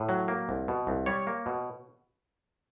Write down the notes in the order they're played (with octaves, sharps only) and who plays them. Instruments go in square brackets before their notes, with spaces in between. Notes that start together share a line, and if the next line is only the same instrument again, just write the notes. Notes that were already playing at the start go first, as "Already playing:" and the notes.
Already playing: [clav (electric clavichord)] A2
F#3
A#3
C2
B2
C2
G3 C#5
A#3
B2